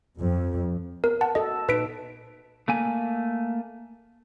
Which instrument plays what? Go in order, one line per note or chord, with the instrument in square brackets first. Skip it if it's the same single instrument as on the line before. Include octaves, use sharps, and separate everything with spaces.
[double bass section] F2
[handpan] B3 [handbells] A#4
[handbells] F#5 A5
[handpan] F#4 A4 [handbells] D#5
[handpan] A#2 D#4 [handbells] B4 B6 D7
[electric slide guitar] A3 A#3 G#5